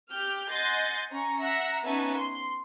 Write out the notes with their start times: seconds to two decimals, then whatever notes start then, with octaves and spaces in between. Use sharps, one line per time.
0.12 G4 F6 G6
0.49 D#5 F#5 G#5 C6 G6 A6
1.10 C#4 A#5 C#6
1.40 E5 F#5 A#5 E6 A#6
1.85 B3 C#4 D#4 E5 G#5 A5
2.18 C6